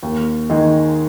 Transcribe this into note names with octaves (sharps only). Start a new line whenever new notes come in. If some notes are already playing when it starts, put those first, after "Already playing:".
D#2
D#3 G#3 D#4 G#4